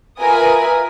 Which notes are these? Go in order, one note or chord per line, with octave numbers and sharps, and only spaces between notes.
F4 A#4 B4 E5 G#5 D#6